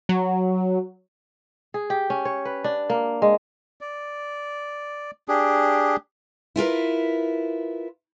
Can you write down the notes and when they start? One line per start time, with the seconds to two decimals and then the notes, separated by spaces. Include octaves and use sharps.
0.09 F#3
1.74 G#4
1.90 G4
2.10 C#4
2.25 C#5
2.45 B4
2.64 D4
2.90 A#3
3.22 G#3
3.81 D5
5.28 D4 G4 G#4
6.56 E4 F4 A#4 B4